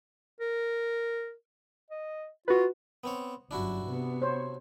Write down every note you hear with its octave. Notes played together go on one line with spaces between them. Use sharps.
A#4
D#5
F4 F#4 B4
B3 C4 C#5
G1 F#2 D4 E4 F#4
C3 B3
C5 C#5